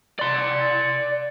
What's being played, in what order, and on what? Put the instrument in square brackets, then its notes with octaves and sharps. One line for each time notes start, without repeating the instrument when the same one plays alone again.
[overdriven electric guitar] D5 C6